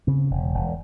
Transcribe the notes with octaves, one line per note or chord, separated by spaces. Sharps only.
C#3 C4
E1
E1